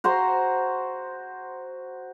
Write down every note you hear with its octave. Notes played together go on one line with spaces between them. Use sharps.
F#4 C5 A#5 C6